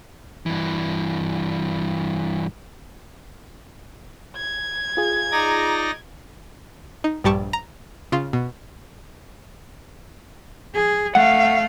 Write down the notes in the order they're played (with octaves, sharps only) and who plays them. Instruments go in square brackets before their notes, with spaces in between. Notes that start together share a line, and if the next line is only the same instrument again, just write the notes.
[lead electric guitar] G2 E3
[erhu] G#6
[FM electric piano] F4 G#4
[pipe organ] D#4 D5 A#6 [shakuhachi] A#5
[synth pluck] D#4
A#1 G2 G3 G4 A5 C#6
A#5
C#3 F4
B2
[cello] G#4
[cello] A3 F5 [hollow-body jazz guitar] F#5